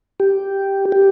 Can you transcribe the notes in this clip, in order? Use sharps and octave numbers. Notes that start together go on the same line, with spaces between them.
G4
G4